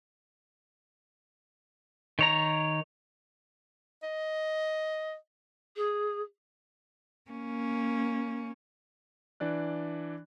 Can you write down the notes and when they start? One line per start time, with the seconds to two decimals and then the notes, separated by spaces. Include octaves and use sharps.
2.19 D#3 C#5 A#5
4.03 D#5
5.76 G#4
7.31 A#3 C#4
9.40 E3 D4 D5 F#6